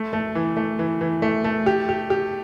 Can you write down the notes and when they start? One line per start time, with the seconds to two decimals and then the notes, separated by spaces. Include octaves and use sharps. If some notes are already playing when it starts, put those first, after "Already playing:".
Already playing: A3
0.13 A3
0.35 E3
0.57 A3
0.79 E3
1.01 E3
1.22 A3
1.44 A3
1.66 G4
1.89 G4
2.10 G4